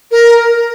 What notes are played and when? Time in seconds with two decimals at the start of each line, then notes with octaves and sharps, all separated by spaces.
0.11 A#4